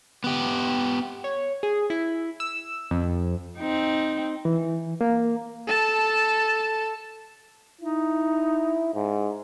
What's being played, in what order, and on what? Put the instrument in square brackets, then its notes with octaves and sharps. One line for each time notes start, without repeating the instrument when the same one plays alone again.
[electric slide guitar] B3 G4
[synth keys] C#5
G#4
E4
E6
F2
[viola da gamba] C4 D#4
[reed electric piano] E3
A#3
[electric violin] A4 A5
[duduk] D#4 [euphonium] E4
[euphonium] G#2